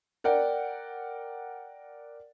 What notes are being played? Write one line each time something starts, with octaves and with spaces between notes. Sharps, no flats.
A#4 D5 F#5 G5